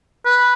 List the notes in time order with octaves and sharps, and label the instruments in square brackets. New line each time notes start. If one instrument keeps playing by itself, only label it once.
[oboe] B4